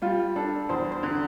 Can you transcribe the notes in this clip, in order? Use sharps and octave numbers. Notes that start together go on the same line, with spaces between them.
G3 F4
D4 A4
E2 C5
C5
D3